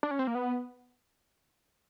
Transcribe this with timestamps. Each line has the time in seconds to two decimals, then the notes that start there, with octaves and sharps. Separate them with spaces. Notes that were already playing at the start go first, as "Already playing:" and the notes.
0.03 D4
0.11 C#4
0.19 C4
0.27 A#3
0.35 B3